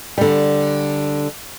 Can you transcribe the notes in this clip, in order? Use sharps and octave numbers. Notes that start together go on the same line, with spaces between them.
D3 G3